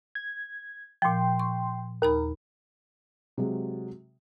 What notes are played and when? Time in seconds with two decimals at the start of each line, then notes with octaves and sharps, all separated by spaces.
0.15 G#6
1.02 A#2 F3 G5 C6
1.40 C#6
2.02 D#2 D#4 A#4 B5
3.38 C3 F#3 G#3